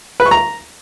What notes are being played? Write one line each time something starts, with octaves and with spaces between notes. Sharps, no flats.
B4
C#6
A#5